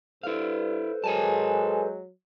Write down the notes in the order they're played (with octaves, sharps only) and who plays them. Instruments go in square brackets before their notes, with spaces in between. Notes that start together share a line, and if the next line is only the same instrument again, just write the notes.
[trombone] G2 [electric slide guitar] E4 F5 [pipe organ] A4 B4 C5
[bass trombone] F#3 [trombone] G#3 [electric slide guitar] A#4 G#5 A5